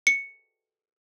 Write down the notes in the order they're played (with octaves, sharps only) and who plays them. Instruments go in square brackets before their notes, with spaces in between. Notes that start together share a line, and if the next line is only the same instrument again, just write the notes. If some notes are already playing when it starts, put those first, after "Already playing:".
[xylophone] C#7